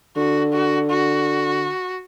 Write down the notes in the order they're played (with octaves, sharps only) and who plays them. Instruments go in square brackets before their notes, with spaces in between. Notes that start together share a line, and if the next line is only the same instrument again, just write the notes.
[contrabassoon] D3 [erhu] F#4
[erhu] F#4
F#4